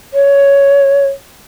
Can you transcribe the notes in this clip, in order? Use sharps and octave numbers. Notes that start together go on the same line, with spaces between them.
C#5